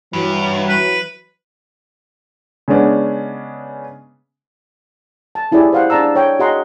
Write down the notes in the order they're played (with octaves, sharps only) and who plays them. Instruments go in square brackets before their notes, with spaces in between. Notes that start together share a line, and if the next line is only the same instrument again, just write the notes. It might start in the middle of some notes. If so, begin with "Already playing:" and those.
[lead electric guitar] G2 [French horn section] E3 F#3
[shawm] B4
[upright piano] C#3 G#3 B3 C#4 D4
[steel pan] A5
C#4 E4 G4 G#4 D5 G#5
C5 F5 F#5
D4 G#4 D5 A5 A#5 E6
C#5 G5
F#4 G#4 D#5 F#5 A#5 C6